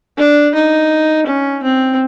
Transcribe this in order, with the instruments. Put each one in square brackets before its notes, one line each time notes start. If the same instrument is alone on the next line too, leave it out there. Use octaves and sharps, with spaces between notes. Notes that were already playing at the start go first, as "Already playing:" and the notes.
[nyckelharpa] D4
D#4
C#4
C4